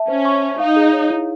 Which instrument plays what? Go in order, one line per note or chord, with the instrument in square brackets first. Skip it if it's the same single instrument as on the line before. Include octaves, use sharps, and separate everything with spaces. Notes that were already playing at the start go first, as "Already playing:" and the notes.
Already playing: [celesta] E5 A5
[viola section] C#4 [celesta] C5
[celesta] C#6
E5
[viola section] D#4 [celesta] F5
[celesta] G#4
C#5
E4